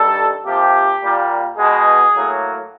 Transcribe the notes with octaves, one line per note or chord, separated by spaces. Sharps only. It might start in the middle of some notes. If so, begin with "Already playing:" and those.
Already playing: G2 D#3 G3 A4
C3 F3 A#3 G4
A#2 G3 A#3
B2 G#3 B3 G#4
A2 F#3 A#3